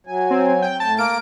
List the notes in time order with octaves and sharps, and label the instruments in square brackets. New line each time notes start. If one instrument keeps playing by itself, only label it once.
[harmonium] F#3 G#5
[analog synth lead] C4
G5
[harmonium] A2 [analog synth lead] A5
[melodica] A#3 A#4 [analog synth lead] D7